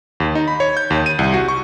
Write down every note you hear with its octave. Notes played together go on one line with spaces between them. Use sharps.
D#2
D#4
B5
C#5
G6
D#2
D#7
C2
F#4
C#6